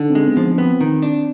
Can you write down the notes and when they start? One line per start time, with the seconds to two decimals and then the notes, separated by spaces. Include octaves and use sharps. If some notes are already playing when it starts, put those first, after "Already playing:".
Already playing: D3 D4 D#4
0.10 C4
0.15 G#3
0.25 B3
0.37 F3
0.58 B3 C4
0.81 D#3
1.02 D4